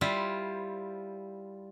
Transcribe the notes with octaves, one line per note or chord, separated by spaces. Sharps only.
G3 E4 F4 C5